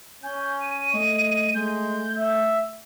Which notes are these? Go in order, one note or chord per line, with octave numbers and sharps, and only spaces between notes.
C#4 G#5 G6
D#7
A3 D#5
G#3 A3 G6
E5